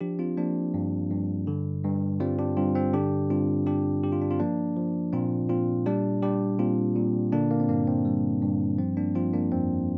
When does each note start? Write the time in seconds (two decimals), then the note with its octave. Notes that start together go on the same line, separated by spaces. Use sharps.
0.01 F3 D4 G4
0.19 C4 F4
0.37 F3 A#3 D4
0.74 G2
1.11 G2
1.47 D3
1.84 G2
2.20 G3 C4 F4
2.39 D4 G4
2.56 G2 C4 F4
2.75 C4
2.93 D3 D4 G4
3.30 G2 C4 F4
3.66 G3 D4 G4
4.03 G2 G4
4.12 F4
4.21 D4
4.30 C4 F4
4.40 F3 A#3 D4
4.76 F3
5.13 A#2 C4 F4
5.49 A#2 C4 F4
5.86 G3 D4 G4
6.23 G3 D4 G4
6.59 A#2 C4 F4
6.96 A#2
7.32 D3 A#3 D4
7.51 A#3
7.60 C4
7.69 G2 A#3
7.87 C4
8.05 G3
8.42 G2
8.78 F3 C4
8.97 A#3 D4
9.15 F3 C4 F4
9.33 A#3 D4
9.52 F2 C4